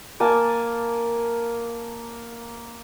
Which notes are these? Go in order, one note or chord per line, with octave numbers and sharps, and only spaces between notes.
A#3 G#5 A5